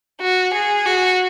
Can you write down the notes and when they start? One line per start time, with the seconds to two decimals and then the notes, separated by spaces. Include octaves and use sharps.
0.21 F#4
0.54 G#4
0.86 F#4